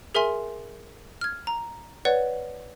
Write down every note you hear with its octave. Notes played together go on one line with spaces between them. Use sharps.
G#4 A#4 E5 G#5 C6
F6 G#6
A#5
B4 C#5 D5 F#5